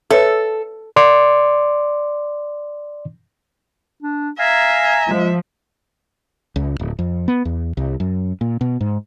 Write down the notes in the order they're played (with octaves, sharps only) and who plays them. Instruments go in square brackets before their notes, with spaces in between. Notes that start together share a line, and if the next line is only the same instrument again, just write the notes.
[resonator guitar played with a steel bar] A4 [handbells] B4 C#5 E5
[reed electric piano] D5 C6 D6
[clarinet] D4
[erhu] E5 [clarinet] F5 [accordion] G#5 A#5
[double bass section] F3 [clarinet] G#3
[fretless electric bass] C#2
D1
F2
B3
E2
C2
F#2
A#2
B2
G#2